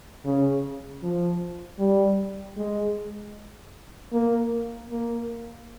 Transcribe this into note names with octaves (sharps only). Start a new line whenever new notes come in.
C#3
F3
G3
G#3
A#3
A#3